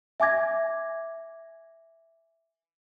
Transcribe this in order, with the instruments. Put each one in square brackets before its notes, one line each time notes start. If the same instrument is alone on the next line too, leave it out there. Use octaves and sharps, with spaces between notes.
[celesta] E5 G#5 D6 G#6 A#6